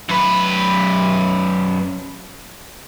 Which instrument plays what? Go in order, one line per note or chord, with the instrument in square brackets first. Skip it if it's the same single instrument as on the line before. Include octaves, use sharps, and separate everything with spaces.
[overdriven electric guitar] F#2 B4